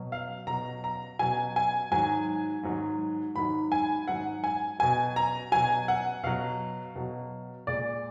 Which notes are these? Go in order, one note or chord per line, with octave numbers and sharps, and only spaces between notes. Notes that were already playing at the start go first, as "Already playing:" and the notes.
Already playing: B2 F#3
F5
B2 F#3 A#5
A#5
B2 F#3 G#5
G#5
G#2 D#3 F#3 G#5
G#2 D#3 F#3
G#2 D#3 F#3 B5
G#5
G#2 D#3 F#3 F#5
G#5
B2 F#3 G#5
A#5
B2 F#3 G#5
F#5
B2 F#3 F5
B2 F#3
A#2 G#3 D5